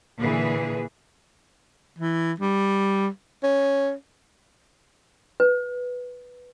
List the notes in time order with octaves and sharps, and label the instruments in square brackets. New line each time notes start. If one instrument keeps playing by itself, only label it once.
[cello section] A#2 D3 E3 G#4 B4
[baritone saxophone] E3
G3
C#4
[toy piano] B4